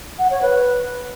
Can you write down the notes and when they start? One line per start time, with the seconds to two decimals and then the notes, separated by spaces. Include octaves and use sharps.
0.19 F#5
0.30 C#5
0.42 B4